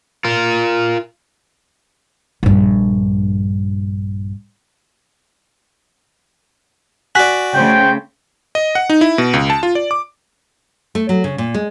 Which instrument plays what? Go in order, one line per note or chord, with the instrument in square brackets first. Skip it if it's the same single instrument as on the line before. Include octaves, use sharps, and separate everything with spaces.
[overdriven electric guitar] F4 A#4
[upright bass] A#1 G2
[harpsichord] F#4 D5 [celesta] G#5 F#6 B6
[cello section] C#3 A3 [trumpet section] C5 G5
[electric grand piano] D#5
F#5
D#4
E4
B2
C#2
A5
F4
D5
D6
[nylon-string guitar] A3
F#3
C#3
A#2
G#3